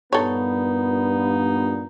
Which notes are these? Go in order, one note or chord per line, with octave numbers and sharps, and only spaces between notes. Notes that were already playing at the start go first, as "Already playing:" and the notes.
G2 A#2 B3 D#4 A4 C#5